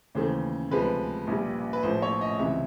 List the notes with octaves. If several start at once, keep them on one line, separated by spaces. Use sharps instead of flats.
D#2 C#3 E3 A3 C5
D2 C3 F3 G#3 B4
A#1 A#2 G3
B4
A#1 A2 F3 C5
C#5
D#5
C#2 C3 E3 E5